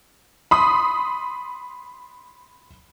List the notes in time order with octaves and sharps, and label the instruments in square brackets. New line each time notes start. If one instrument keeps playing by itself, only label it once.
[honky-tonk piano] B5 C6 D#6